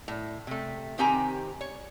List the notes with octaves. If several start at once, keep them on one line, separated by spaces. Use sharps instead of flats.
A2
C3 A3
C3 D#3 C4 G4 G#5 A#5
C#5